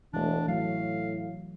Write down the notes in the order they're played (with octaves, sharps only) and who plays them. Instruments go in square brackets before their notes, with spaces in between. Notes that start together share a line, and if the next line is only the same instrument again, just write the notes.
[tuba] E1 [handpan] E3 A3 [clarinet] D4
[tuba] A2 [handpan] F#3 [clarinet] F5